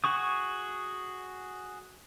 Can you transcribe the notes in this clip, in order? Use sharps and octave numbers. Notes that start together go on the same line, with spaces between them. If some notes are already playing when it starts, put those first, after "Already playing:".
F#4 G#4 C#6 D#6